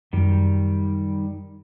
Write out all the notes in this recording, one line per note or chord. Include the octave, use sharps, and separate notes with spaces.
F#2 D#3 G3